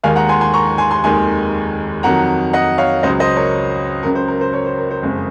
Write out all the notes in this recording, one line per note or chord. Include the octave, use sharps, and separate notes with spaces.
D#2 D#3 G#3 F5 G#5
F#5 A#5
G#5 C6
G#5 C6
A#5 C#6
G#5 C6
G#5 C6
F1 D#2 D#3 G#3 G#5 C6
F2 D#3 F#3 F#5 A#5
D#5 F#5
C#5 F5
C#2 C#3 F#3 C5 D#5
C5 D#5
A#4 C#5
C#2 C#3 F#3 A#4
C5
A#4
C5
A#4 C#5
C5
A#4
C5
F#1 F2 C#3 G#3